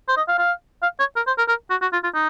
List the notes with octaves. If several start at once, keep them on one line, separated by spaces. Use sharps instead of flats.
C5
D#5
F5
F5
F5
C#5
A#4
C5
A#4
A#4
F#4
F#4
F4
F4
D#4